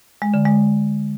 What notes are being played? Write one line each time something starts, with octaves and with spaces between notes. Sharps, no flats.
G#3
D3
G#3